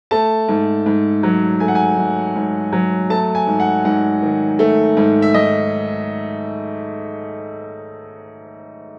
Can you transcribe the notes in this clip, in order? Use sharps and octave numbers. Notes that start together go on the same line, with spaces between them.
A3 A5
G#2
G#2
F#3
A3 G#5
F#5
G#5
G#2
G#2
F#3
A3 A5
G#5
G#2
F#5
G#2 F#5
D#3
A3
G#2
E5
G#2 D#5